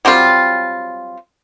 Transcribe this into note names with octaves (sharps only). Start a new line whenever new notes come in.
F#3 G3 C4 F4